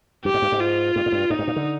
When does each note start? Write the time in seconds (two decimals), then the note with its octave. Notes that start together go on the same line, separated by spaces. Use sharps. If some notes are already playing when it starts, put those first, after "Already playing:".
0.25 G2 G4
0.34 G#2
0.42 G2
0.52 G#2
0.61 F4
0.96 G2
1.06 G#2
1.12 G2
1.30 G#2 D#4
1.39 G2
1.48 A#2
1.56 D3